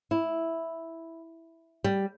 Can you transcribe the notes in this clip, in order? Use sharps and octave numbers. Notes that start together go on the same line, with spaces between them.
E4
G3